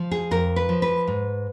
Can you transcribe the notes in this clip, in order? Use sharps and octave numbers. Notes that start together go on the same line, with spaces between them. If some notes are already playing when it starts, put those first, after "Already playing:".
Already playing: F3
G#4
F2 A#4
B4
F3
B4
G#2